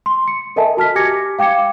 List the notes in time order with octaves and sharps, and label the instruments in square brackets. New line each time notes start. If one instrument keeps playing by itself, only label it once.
[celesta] C6
C#7
A4 A#4 D#5 E5 G#5 A5
F#4 A5 F6 B6
G4 G#5 D6 G#6 A#6 C#7
F5 G5 D6 G#6 C#7